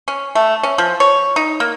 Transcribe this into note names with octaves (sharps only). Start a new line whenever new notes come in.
C#4
A3
C#4
F3
C#5
D#4
A#3